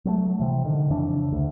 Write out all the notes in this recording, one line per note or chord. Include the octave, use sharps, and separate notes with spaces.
F#3 G3 A3
C3 E3
D3 D#3
F2 C#3 E3 D4
D2